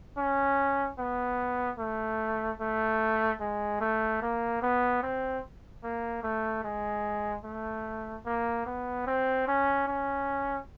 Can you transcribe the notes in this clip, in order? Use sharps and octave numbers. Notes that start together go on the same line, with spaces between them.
C#4
B3
A3
A3
G#3
A3
A#3
B3
C4
A#3
A3
G#3
A3
A#3
B3
C4
C#4
C#4